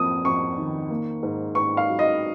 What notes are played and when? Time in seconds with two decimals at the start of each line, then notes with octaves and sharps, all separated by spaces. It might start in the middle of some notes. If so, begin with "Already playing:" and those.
Already playing: F2 A#3 D#6
0.25 F2 C#6
0.57 D#3
0.90 A#3
1.23 G#2
1.55 G#2 C#6
1.77 F5
1.88 F#3
1.99 D#5